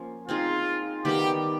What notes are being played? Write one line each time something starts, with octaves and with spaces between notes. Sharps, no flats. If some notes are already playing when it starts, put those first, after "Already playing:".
Already playing: F3 A#3 C#4
C4 D#4 F4 G#4
D#3 G3 B3 G4